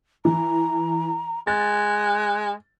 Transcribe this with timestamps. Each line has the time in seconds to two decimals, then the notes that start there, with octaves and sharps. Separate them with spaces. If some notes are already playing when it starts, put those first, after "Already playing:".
0.25 E3 A#5
1.47 G#3 F#6 A6